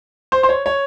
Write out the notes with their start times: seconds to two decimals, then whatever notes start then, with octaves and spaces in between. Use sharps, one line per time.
0.32 C5
0.43 C5
0.49 C#5
0.66 C#5